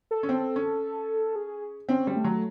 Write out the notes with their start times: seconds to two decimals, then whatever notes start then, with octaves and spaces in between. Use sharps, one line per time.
0.11 A4
0.23 C#4
0.29 C4
0.56 C#4
1.36 G#4
1.89 C4 C#4
2.07 G3
2.16 A3
2.24 F#3